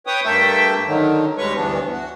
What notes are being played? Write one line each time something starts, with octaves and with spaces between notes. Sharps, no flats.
B4 C#5 G5 D#6
G2 A3 A#3 A4 E5 G5
D3 D#3 F#3
D2 G3 G#3 B4 C#5 C#6
D2 G2 E3 B3 D4
F#4